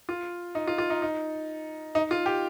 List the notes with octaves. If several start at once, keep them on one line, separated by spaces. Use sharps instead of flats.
F4
D#4
F4
F4
D#4
D#4
D#4
F4
G4